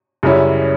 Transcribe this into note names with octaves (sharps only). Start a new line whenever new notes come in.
F#2 C#3 G3 C#4 E4